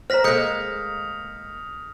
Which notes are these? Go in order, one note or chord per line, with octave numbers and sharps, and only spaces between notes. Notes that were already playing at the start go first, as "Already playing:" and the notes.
C5 A#5 F6 A#6 B6
G#3 A#3 A4 D#6 G6 C#7